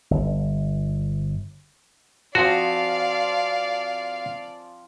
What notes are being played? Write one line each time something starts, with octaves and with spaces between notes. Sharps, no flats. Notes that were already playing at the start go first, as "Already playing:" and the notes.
G1
F3 C4 F#4 D5 F5 G#5